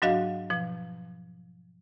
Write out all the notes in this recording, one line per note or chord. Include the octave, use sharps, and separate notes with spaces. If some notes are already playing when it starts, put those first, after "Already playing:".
G#2 F#3 D4 F#4 D#5 F5
B2 F3